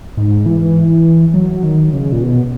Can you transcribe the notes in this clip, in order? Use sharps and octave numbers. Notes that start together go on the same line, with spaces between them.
G#2
E3
F#3
D#3
C#3
A#2
B2